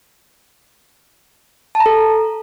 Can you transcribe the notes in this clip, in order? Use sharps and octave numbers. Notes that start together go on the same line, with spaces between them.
A5
A#5
A4